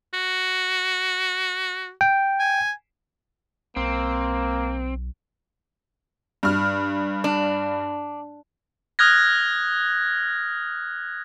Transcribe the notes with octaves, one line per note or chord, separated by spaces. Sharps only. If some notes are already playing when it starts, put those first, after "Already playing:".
F#4
G5
G#5
B1 A#3 C4
G2 F6
D4
D#6 F6 F#6 G#6 A#6